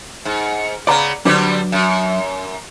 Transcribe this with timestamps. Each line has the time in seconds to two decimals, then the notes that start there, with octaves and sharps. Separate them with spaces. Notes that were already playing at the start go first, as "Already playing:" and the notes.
0.25 G#2
0.87 C#3 B3 D5 A#5
1.25 D3 F#3 G3 C4 D4 B4
1.72 F#2